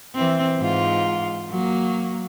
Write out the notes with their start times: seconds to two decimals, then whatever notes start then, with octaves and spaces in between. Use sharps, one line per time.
0.15 E3 C4
0.59 G#2 F4
1.50 F#3 A#3